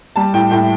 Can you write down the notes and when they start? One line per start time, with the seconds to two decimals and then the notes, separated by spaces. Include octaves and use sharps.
0.16 G3 A5
0.34 A2 G5
0.51 A2 G5